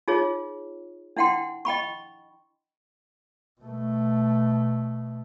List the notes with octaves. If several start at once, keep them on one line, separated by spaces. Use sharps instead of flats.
D#4 F4 G#4 C#5
D4 E4 F#5 G5 C6
D#5 G5 B5 C#6
B2 A3